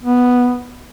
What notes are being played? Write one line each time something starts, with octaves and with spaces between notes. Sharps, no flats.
B3